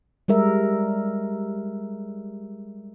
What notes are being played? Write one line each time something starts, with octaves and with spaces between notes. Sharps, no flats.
G3 G#3 A#4 E5